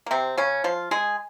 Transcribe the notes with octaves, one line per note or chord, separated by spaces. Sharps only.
A#3
C3 C4
C#3 C#4
F3 F4
G#3 G#4